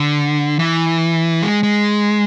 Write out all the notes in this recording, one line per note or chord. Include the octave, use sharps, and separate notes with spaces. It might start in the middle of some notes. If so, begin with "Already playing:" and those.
Already playing: D3
E3
G#3
G#3